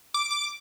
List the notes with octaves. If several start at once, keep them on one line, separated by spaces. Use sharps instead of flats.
D6
D6